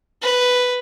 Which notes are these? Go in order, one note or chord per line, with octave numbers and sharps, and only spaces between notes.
B4